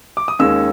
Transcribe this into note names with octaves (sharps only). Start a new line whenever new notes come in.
D6
D#6
D#2 D#3 G#3 C#4 E6